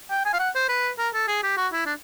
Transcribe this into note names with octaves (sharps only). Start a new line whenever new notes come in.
G5
G#5
F5
F#5
C5
B4
A#4
A4
G#4
G4
F#4
E4
D4